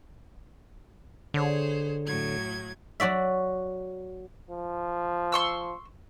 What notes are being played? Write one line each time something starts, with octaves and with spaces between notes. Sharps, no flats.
D3 G#4 C5 C#5
A2 F#3 G#6
F#3 F#4 D5 E5
F3
C6 C#6 E6